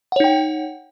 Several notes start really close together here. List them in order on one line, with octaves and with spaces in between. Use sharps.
F#5 C#5 D#4 G5